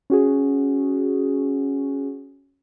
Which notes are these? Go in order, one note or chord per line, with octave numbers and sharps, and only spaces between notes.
C#4 F#4 G#4